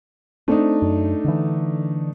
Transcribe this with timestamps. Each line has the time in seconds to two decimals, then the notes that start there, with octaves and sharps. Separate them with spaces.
0.48 A3 C4 D4 D#4
0.82 F#2
1.25 D3 E3